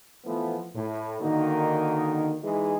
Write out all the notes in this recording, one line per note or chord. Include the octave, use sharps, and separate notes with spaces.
E3 F3 A3 B3
A2
D3 D#3 A#3 D#4 F#4
E3 G#3 D#4 G#4